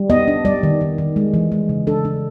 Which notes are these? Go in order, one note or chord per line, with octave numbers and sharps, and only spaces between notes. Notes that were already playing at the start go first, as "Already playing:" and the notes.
Already playing: G3
B3 D#5
D4
G3 D5
D#3
D#3
D#3
G#3
E3
G#3
C#3
D4 A4
D4